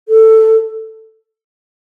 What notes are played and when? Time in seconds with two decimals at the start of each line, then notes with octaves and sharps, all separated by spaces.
0.09 A4